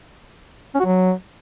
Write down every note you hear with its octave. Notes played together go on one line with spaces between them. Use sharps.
C#4
F#4
F#3